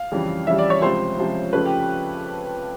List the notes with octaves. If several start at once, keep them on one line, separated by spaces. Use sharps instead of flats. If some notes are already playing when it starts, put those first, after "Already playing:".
Already playing: F5
F2 C#3 E3 G3
F2 C#3 E3 G3 E5
D5
C#5
C#2 C3 F3 C5
C#2 C3 F3
F2 C#3 F3 A3 C#4 B4
G4